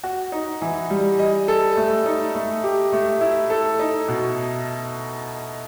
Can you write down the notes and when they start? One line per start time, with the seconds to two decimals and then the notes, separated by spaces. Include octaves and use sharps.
0.04 F#4
0.32 D#4
0.62 E3
0.90 G3
1.19 D#5
1.48 A4
1.77 A3
2.06 D#4
2.35 A3
2.64 G4
2.93 A3
3.21 E4
3.50 A4
3.79 D#4
4.08 B2